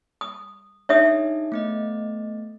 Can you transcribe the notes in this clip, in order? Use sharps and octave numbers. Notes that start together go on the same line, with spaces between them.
D#6
D4 D#4 G#4 C#5 E5 D#6
A3 B3 D#5